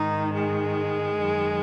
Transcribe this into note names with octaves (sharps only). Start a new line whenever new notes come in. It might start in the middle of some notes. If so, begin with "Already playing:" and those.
Already playing: G#2 D#3 D#4
G#3
F#2 D#3